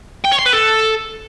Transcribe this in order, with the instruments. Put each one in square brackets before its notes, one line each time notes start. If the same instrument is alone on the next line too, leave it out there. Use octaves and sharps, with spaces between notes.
[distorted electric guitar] G5
C#5
C6
B4
A4